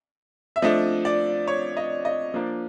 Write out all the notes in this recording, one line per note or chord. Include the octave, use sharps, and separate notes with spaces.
E5
F3 A3 D4 D#5
D5
C#5
D#5
D#5
F3 A#3 D4